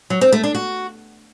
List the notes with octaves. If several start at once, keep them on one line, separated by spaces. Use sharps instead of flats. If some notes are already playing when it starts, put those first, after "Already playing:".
F#3
C4
A3
D4
F#4